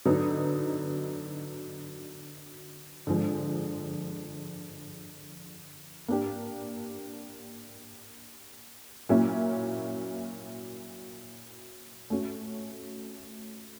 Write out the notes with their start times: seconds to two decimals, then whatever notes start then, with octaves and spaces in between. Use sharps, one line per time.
0.05 D3 F#3 B3 D#4
3.07 D3 F3 G#3
6.08 A#3 D4 G4
9.09 A#2 F#3 A#3 C#4 E4
12.10 A3 C#4 F#4